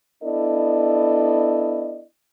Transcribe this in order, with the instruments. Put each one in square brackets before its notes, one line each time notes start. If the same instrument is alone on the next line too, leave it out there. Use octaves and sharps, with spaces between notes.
[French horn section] B3 D4 E4 A4 D5 D#5